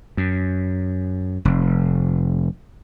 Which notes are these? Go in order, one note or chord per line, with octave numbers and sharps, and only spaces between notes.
F#2
F1